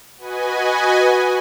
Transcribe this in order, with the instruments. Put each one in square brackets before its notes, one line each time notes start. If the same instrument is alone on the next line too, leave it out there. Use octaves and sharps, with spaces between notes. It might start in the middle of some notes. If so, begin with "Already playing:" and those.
[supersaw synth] F#4 B4 D#5 G#5